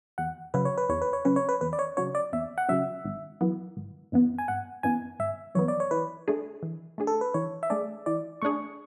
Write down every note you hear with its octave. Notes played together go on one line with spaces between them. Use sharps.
E2 F#5
C#3 F#3 C#4 B4
C#5
B4
E2 C#5
B4
C#5
C#3 F#3 C#4 B4
C#5
B4
E2 B4
D5
C#5
C#3 F#3 C#4 C#5
D5
E2 E5
F#5
C#3 F#3 C#4 E5
G#1
F#2 E3 B3
G#1
F#2 E3 B3
G#5
G#1 F#5
F#2 E3 B3 G#5
G#1 E5
F#2 E3 B3 C#5
D5
C#5
E3 B4
A3 D4 G#4
E3
A3 D4 G#4
A4
B4
E3 C#5
E5
A3 D4 G#4 D5
E3 D5
A3 D4 G#4 C#6